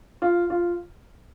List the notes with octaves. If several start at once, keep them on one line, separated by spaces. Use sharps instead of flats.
F4
F4